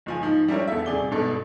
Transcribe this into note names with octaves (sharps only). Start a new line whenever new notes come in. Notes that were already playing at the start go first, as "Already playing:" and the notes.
F#1 F3 G#5
G#2 F3 D#4
G3 D4 E4 A#4 C#5
E2 A4 E5
D#1 C3 G#4 D5 G7
G#1 G2 B2 A4